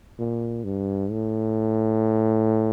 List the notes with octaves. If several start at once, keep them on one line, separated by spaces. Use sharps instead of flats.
A#2
G2
A2